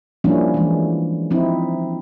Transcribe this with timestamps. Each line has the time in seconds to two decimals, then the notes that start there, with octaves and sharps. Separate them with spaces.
0.24 F3 G3 A#3 C#4 D4 E4
0.54 E3 G#3
1.31 F3 C4 D#4 E4